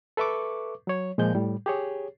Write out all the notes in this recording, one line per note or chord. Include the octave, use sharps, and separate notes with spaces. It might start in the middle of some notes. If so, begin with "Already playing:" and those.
A4 B4 E5 C#6 D6
F#3 C#5
A#2 F3 G#3 G6
A2 G3
G4 G#4 C#5